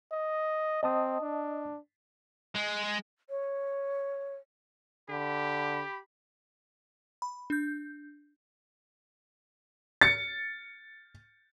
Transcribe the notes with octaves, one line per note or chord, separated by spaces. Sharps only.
D#5
C4 D#5 A5 D#6
D4
G#3
C#5
D3 G4 B5
B5
D4 G6
A6 C#7